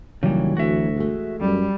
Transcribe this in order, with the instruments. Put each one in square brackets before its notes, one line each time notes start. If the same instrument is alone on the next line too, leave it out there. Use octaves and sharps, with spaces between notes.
[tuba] D#2 [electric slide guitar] C#3 G3 [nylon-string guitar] E3 F#3
[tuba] D2 [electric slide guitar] F#4 E5
[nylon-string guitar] G#3 A3
[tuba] F#2 [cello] G3